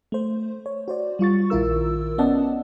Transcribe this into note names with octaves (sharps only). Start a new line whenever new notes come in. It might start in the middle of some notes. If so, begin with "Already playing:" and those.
A3 C5
C#5
F#4 C5 D5
G3 F4 C#6 A6
A#1 D#3 E4 F4 A#4 E6
B3 C#4 D5 D#5 F#5 A5